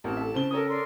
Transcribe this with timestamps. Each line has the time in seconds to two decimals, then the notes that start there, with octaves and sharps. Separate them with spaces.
0.04 A1 C4 A#4 A5
0.17 A4 E5
0.34 C#3 C4 G7
0.51 A4 A#4 C#5 G5 A5 D#6
0.67 A#4 D5 C6